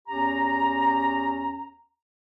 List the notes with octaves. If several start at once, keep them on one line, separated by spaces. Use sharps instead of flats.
E2 C#4 G4 A#5